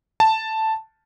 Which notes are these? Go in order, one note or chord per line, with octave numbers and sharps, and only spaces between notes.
A5